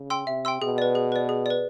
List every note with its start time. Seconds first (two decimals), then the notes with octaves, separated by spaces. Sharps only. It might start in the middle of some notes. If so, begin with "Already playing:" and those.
Already playing: C#3
0.10 G5 C6 E6
0.27 C3 E5
0.45 G5 C6 E6
0.62 B2 G#4
0.78 B4 D5
0.95 G#4
1.12 B4 D5
1.29 G#4
1.46 B4 D5